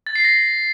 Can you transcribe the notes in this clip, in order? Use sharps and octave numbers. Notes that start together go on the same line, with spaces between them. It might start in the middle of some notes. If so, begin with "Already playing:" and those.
A6
C7
A#6